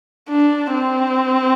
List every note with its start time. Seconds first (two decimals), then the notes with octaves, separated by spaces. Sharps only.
0.29 D4
0.74 C4